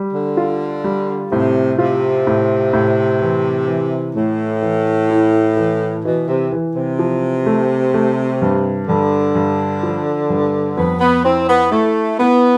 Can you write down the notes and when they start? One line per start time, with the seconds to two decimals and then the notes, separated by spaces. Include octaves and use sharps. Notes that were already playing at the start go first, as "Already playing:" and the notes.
Already playing: G3
0.14 D3
0.37 F4
0.84 G3
1.32 A2 C3
1.79 C3 F4
2.27 A2
2.73 A2
3.21 E3
3.68 E3
4.15 A2 A3
4.62 E3
5.10 E4
5.57 E3
6.05 B2 E3
6.29 C3
6.52 E3
6.76 C3
6.99 F3
7.46 A3
7.94 A3
8.42 G2
8.88 G2 D3
9.35 G2
9.83 F3
10.30 G2
10.77 F2 B3
11.01 B3
11.25 C4 E4
11.49 B3
11.72 A3 E4
12.20 B3 E4